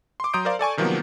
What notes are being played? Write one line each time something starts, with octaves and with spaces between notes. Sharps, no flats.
C6 D6
F#3 A#5 C6 D#6 G6 D7
A#4 C5 D5 F5
A4 D5 G#5 C#6
C3 D#3 F3 F#3 A#3 B3